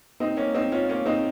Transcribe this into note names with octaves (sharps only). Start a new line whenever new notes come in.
C4 D#4
A#3 C#4
C4 D#4
C#4 F4
A#3 C#4
C4 D#4